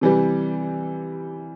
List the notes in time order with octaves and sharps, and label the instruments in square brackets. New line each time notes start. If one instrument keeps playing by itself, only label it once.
[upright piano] C3 E3 G3